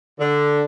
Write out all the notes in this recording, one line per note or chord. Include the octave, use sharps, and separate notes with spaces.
D3